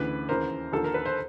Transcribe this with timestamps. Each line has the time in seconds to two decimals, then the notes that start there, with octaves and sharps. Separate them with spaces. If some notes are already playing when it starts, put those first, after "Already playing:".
Already playing: D2 C#3 E3 B4
0.29 D#2 C#3 E3 A#4 C5
0.72 D#2 D3 F3 A4
0.84 A#4
0.94 B4
1.05 C5